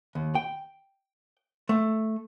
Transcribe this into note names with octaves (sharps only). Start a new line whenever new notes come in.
D#2
G5
A3